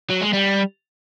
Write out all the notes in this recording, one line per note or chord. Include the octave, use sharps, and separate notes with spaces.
F#3
G#3
G3